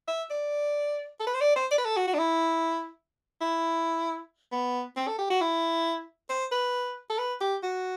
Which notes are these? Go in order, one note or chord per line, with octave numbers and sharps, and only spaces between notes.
E5
D5
A4
B4
C5
D5
C5
D5
B4
A4
F#4
F#4
D4
E4
E4
B3
C4
A4
G4
F#4
E4
C5
B4
A4
B4
G4
F#4